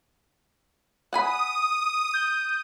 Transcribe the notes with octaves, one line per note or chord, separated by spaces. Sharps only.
F#5 G#5 B5 D#6
G6